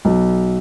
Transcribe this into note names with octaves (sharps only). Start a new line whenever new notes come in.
B1